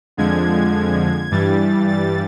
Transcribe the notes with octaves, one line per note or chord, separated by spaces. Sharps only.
F2 D3 F3 G#3 G#6
G2 E3 G3 A6
A6